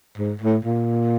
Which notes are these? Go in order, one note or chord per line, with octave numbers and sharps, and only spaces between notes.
G#2
A2
A#2